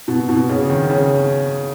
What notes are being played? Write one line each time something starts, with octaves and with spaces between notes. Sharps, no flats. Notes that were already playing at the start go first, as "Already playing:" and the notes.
B2
B2
C#3
D#3
C#3